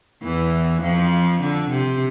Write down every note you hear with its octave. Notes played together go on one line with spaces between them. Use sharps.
E2 E3
F2 F3
D3
C3